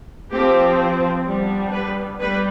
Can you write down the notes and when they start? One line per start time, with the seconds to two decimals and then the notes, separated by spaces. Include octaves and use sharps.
0.32 F3 C4 G4
1.26 G3 B3 D4
1.72 B4
2.20 G3 B4